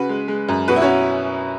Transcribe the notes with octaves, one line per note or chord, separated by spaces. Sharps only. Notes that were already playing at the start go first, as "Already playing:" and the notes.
Already playing: C#3 F#4 B4
G#3
G#3
F#2
B2 F#4 B4
E4
C#4 F#4